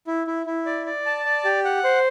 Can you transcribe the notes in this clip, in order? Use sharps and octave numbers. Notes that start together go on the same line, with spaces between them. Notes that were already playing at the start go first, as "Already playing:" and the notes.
E4
E4
E4
D5
D5
A5
D5
G4
F#5
C5